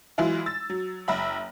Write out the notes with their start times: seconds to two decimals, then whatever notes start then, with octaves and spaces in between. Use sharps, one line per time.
0.18 E3 F#3 G#3 E4 F4
0.46 E6 A6
0.70 F#3
1.08 F#1 E5 B5